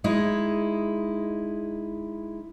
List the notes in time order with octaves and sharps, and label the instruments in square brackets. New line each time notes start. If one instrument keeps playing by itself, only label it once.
[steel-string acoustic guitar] G#3 D#4 E4